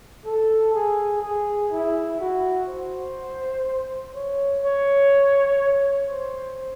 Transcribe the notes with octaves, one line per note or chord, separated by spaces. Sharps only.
A4
G#4
G#4
E4
F#4
C5
C#5
C#5
C5